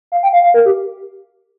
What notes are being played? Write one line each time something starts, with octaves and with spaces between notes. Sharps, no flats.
F5
G5
F5
F5
A#4
G4